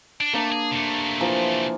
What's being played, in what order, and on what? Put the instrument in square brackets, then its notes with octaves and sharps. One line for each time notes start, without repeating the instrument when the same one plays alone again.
[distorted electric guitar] D4
[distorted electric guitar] A3 [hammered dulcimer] A#3 D4
[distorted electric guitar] G#4
C3 A3
[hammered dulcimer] E3 F3 A#3